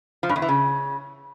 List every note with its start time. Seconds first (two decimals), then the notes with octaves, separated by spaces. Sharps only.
0.23 F3
0.29 G2
0.36 E2
0.42 E3
0.48 C#3